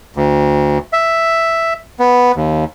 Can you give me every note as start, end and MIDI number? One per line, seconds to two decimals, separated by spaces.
0.16 0.78 38
0.93 1.74 76
2.00 2.32 59
2.36 2.64 39